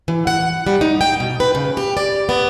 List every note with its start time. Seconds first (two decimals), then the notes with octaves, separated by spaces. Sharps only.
0.08 E3
0.27 F#5
0.67 G3
0.81 D#4
1.01 G5
1.20 B2
1.40 B4
1.55 C#3
1.77 G4
1.97 D5
2.29 B3